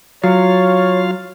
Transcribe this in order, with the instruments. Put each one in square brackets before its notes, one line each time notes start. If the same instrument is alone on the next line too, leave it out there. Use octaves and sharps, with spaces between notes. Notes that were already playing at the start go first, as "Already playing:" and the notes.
[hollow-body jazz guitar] F#3 [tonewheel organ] F4 F5 [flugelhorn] C#5